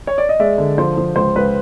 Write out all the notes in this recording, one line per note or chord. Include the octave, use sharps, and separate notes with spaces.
C#5
D5
D#5
G#3 D5 E5
D3
F3 C5
F3
C#2 C5
C#2 B4